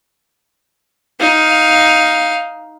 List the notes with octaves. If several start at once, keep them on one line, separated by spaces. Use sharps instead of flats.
D#4 F5